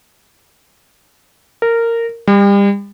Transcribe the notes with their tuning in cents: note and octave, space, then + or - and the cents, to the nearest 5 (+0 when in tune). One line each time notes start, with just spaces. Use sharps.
A#4 -15
G3 +35